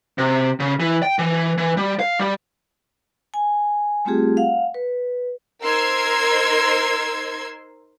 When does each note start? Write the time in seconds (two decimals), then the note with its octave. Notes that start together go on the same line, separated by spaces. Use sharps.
0.18 C3
0.60 C#3
0.80 E3
1.03 G5
1.19 E3
1.58 E3
1.77 G3
2.00 F5
2.19 G3
3.34 G#5
4.05 G3 A3 C4 F4 G4 G#4
4.37 F5 F#5
4.74 B4
5.62 D#4 A#4 C5 C6 E6 G#6